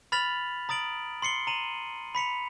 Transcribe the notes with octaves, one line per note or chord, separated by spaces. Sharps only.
B5 F6 A6 B6 F7 F#7
A#5 D#6 A6 D7 F#7
C6 C7 C#7 G7
A#5 D#7 F#7
B5 B6 C#7 F7